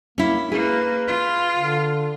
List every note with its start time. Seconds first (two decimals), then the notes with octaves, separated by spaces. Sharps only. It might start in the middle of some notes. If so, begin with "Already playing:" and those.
0.18 A#3 C#4 E4
0.52 A#3 G#4 B4
1.07 F4
1.56 D3